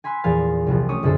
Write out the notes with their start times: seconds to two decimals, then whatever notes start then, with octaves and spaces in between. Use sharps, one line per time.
0.04 G#5 B5 C6 E6 F#6
0.24 E2 A#2 F3 F5 G#5 A6
0.67 C2 F3 F#4
0.89 A3 C#4 C#5 D6 D#6
1.03 B1 F#2 D3 G#4 A4 C5